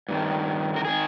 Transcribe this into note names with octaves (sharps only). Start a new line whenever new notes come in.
G2 D#3
A#4
D#3 G#4